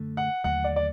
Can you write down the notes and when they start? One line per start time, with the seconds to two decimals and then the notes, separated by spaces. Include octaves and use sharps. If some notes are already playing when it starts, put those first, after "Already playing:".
Already playing: F#2 D3 A3
0.17 F#5
0.44 D#2 D3 F#3 A3 F#5
0.64 D5
0.76 D5